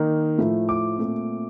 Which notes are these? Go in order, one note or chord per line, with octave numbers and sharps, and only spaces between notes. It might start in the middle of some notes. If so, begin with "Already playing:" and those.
Already playing: D#3 A#3 D#4
A2 F3 A3
D6
A#2 A3 C4